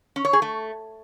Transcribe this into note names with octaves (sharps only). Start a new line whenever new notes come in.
C#4
C#5
G#4
A3